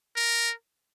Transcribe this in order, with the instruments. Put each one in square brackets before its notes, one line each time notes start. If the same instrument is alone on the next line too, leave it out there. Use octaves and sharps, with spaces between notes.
[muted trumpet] A#4